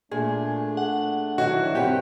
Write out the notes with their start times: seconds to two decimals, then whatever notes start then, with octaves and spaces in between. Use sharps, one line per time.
0.12 A#2 A3 D4 G#4
0.77 F#5
1.38 D#3 E3 F#3 F#4
1.60 F3 D4
1.75 G2 D#3 C4 G4 B4 F5 F#5